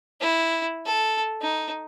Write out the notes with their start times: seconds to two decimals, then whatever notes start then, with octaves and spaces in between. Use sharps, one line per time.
0.21 E4
0.86 A4
1.42 D#4